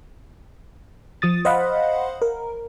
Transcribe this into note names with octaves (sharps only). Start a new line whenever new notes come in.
F3 D#6 A6
C5 D#5 F5 F#5 B5
A#4